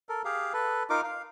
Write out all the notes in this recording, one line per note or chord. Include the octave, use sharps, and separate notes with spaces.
A4 A#4
G4 G#4 F5
A4 B4
D#4 F4 A#4 D6
F5